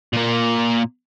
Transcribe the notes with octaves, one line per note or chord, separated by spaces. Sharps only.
A#2 A#3